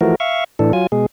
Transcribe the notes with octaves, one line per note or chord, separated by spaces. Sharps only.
E3 F3 A3 F#4 A#4
E5 F5 C#6
A2 E3 D4 A4
F#3 F4 G#5
B2 G#3 G#4